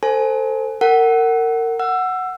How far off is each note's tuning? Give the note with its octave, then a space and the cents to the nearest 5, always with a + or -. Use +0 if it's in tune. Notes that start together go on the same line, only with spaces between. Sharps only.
A4 +25 C5 +0 G#5 +20
A#4 -30 F#5 +20
F#5 +0 E6 +20